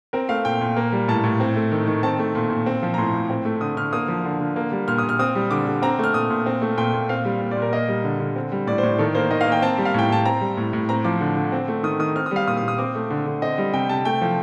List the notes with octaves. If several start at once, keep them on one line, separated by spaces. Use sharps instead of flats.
C4 A#4
A3 F5
A#2 G5
A#2
A#3
G3
A2 A5
A2
C4
A3
D#3
D#3
C4 A5
A3
A#2
A#2
C4
F3
A#5
A2 C6
A2
C4
A3
D3 D#6
D3 F6
A#3 D#6
F3
D3
D3
A#3
G3
A#2 F6
D#6
A#2
F6
C4 D#6
G3
D3 D6
D3
C4 A#5
A3 F6
A#2 D#6
A#2
C4
A3
A#2 G5
A#2
C4 F5
G3
A#2
D5
A#2
A#4
A#3 D#5
G3
D3
D3
C4
G3
A2 D5
C5
A2
D#3 A4
A#3 C5
D#3 D#5
F5
A#3
G5
C4 A5
G3
F5
A2 G5
A2 A5
C4 A#5
G3
A2
A2
C4 A#5
F3 D6
D3
D3
C4
A3
D#3 D#6
D#3 D#6
C4 F6
D#6
G3 F5
A#2 D#6
D#6
A#2
D#6
C4 D6
A3
D3
D3
C4 D#5
G3
C3 G5
C3 A5
A3 G5
F3